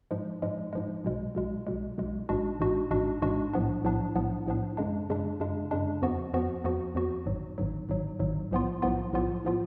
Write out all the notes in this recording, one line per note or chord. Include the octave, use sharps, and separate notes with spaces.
G#2 F3 G#3
G#2 F3 G#3
G#2 F3 G#3
B1 B2 G#3
B1 B2 G#3
B1 B2 G#3
B1 B2 G#3
A1 G#2 G#3 D4 F#4
A1 G#2 G#3 D4 F#4
A1 G#2 G#3 D4 F#4
A1 G#2 G#3 D4 F#4
B1 A2 F3 B3 D4
B1 A2 F3 B3 D4
B1 A2 F3 B3 D4
B1 A2 F3 B3 D4
F#2 C#3 G#3 D4
F#2 C#3 G#3 D4
F#2 C#3 G#3 D4
F#2 C#3 G#3 D4
F2 F3 B3 F#4
F2 F3 B3 F#4
F2 F3 B3 F#4
F2 F3 B3 F#4
G#1 G#2 F#3
G#1 G#2 F#3
G#1 G#2 F#3
G#1 G#2 F#3
B1 A2 F3 B3 F4
B1 A2 F3 B3 F4
B1 A2 F3 B3 F4
A2 F3 B3 F4